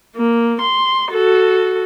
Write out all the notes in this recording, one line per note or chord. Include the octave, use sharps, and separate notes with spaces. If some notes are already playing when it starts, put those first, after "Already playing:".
A#3
C6
F#4 A4